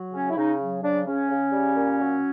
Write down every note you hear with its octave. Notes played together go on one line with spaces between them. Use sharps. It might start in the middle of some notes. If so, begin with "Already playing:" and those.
Already playing: F#3
C#3 C#4
E4
C#3 D#4
F#3
C#3 D4
C#3 C#4
C#3
G3
A#2
F#3